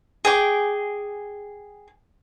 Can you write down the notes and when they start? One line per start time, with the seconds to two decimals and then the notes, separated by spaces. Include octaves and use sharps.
0.25 G#4 G5 D6